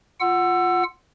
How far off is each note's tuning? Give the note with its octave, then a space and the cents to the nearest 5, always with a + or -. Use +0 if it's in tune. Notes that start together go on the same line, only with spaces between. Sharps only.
F4 +0 F#5 +0 E6 +20